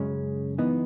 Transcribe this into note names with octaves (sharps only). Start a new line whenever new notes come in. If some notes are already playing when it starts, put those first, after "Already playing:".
Already playing: F#2 C#3 G#3 C#4
E3 B3 D#4